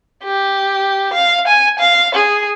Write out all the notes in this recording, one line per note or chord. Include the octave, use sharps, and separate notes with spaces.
G4
F5
G#5
F5
G#4